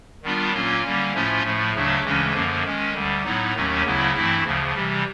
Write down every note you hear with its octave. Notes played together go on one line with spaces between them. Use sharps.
D#3 G3 B3 D4 F4
A#2 F#3 A#3 C#4 F4
D3 G3 A#3 C#4
A2 F3 A3 C#4 F4
A2 F3 A3
D2 C#3 F#3 A3 D4
D2 C#3 E3 G#3 C#4
F#2 D3 F3 A#3
D#3 G#3 C#4
D2 D3 G3
A2 F#3 B3 D#4
D#2 D#3 F#3 A3 C#4
D2 C#3 F#3 B3 E4
G2 E3 A3 C4 E4
D2 C#3 F3
C3 E3 G3